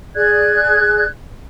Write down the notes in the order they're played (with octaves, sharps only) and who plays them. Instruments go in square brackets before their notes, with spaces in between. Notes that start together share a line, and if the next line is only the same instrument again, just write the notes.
[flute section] G#4 D5 F#6 G#6